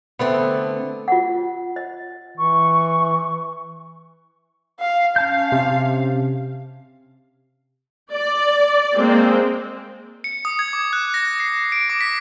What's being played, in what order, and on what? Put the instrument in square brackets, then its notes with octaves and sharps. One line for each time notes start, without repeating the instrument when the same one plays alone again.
[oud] D3 A3 C4 [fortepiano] B3
[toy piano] F4 F#5
D#5
[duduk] E3 [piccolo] C#6
[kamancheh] F5
[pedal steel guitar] C#4 A5 G6 [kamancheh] F5
[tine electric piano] C3
[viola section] D5
G#3 A#3 C4
[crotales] C#7
D#6
G#6
D6
F#6
A#6
C7
D7
D6
B6